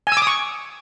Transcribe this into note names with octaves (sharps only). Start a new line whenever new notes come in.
G#5
E6
D6
D#6
C#6